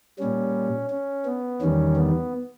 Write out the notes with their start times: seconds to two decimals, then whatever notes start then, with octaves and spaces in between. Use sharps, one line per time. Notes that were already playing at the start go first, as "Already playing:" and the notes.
0.19 A#2 G3 C#4
0.90 C#4
1.26 B3
1.61 E2 D#3 G3 C#4
1.96 B3